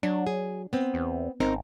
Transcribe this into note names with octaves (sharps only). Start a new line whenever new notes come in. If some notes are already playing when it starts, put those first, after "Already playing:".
F#3 D4
G#4
B3 C4
E2
G#1 C4 D#4 A#4